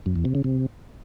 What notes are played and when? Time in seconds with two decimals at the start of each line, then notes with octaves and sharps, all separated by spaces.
0.06 F#2
0.16 E2
0.25 C3
0.35 C#3
0.44 C3